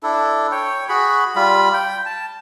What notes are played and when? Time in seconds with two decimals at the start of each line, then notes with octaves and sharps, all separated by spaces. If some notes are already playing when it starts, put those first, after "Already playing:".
0.03 D4 E4 A4
0.51 C#5 G5
0.89 F#4 G#4 B5
1.36 G3 F4 B5
1.73 G5
2.06 A5